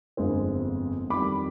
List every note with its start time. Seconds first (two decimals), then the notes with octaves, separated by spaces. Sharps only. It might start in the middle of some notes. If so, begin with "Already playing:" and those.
0.17 G1 F2 D3 G#3 C4
1.10 F2 D#3 G3 B5 D6